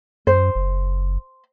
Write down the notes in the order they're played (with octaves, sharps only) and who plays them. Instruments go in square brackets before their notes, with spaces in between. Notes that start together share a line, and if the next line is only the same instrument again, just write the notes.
[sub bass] F#2 [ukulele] C5
[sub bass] F#1